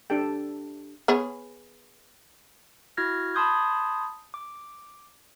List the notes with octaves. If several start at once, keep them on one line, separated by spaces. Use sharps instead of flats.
D4 G4 A4 G5
B3 G#4 C#5
E4 F#4 F6 G#6 A#6
A5 B5 C6 D#6 G6 G#6
D6